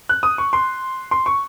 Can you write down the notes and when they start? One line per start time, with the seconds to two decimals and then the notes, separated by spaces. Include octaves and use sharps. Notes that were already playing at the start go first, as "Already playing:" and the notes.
0.09 F#6
0.23 D#6
0.38 C#6
0.53 C6
1.11 C6
1.26 C#6